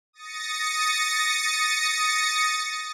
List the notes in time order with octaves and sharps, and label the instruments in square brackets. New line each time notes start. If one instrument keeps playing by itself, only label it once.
[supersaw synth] D#6 A6 A#6 C#7